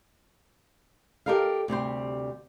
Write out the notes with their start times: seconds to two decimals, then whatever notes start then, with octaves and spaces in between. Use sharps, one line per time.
1.26 G4 A4 A#4 D#5 F5
1.68 D2 C3 G3 C5